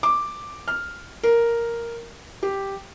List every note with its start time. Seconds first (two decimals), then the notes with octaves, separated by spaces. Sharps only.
0.03 D6
0.68 F6
1.23 A#4
2.43 G4